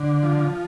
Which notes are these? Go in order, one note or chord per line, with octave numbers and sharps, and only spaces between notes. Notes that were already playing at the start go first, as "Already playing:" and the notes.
Already playing: D3
F3